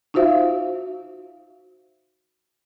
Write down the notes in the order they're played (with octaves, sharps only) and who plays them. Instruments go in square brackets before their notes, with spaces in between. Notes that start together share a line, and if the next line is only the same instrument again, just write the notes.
[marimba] D#4 F4 F#4 C5 E5 F5